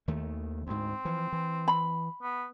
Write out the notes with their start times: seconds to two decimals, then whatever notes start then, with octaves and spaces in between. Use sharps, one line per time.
0.08 D#2 D#3 A3
0.67 D2 G#2 C4
1.05 E3 F3
1.32 E3
1.68 B5
2.22 B3